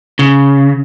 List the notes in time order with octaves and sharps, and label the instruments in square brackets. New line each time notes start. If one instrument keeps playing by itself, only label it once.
[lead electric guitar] C#3